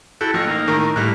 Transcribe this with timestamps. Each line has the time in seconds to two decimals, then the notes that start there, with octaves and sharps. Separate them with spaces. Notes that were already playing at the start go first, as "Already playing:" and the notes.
0.21 E4 F#4 A4 G5
0.34 A1 F3 C#6 E6 A#6
0.47 A#3 D#4
0.67 A2 D#3 A#4
0.96 A2 G3 A3 A#3 F#6